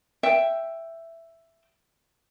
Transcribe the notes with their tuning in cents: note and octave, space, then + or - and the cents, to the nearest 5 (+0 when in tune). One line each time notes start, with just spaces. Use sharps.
E5 +5 G5 +0